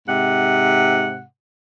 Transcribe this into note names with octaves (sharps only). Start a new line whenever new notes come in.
G#2 C3 F#5